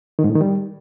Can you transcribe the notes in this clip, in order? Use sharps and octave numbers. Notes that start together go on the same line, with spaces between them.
D#3
G#2
A2
D#3
G3